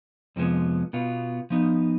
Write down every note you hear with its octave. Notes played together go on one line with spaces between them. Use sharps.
F2 C3 F3 G#3 B3
B2 B3 F4
F3 B3 D#4